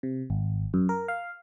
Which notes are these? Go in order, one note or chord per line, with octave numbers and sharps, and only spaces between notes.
C3
G#1
F#2
A#4
F5